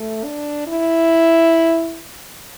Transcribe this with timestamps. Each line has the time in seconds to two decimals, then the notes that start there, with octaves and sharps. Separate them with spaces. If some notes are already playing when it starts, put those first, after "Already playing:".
Already playing: A3
0.24 D4
0.67 E4